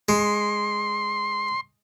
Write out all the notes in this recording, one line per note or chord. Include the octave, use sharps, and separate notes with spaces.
G#3 C6